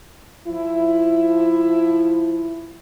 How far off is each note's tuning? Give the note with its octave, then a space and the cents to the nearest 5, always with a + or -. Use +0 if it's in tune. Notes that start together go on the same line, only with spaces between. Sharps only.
F3 +0 E4 +10